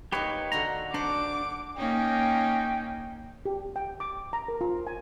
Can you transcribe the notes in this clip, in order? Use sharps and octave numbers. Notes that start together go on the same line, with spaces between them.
A#3 D#4 G4 B4 C#5
D3 F#4 A#5 C6
D4 F#4 C5 D6
A#3 C#4 D#4 G5
G4
G5
D6
A#5
A#4
F4
G#5